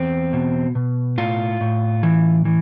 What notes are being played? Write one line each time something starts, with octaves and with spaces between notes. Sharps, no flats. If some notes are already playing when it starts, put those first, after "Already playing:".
Already playing: E2 C4
B2
B2
A2 F4
A2
E3
E3